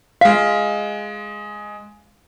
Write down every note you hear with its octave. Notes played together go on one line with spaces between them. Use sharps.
G#3 F5 B6